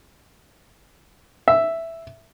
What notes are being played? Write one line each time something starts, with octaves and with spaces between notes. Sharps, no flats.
E5